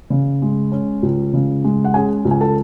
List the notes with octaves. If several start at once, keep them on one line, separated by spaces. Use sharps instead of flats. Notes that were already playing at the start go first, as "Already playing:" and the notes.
C#3
G#3
C#4
C#2
C#3
G#3
F#5
C#4 G#4 G#5
C#2
G#5
A4 A5